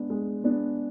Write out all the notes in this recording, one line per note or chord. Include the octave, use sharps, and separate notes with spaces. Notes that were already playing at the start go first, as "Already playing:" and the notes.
Already playing: G#3 B3 D4
G#3
B3 D4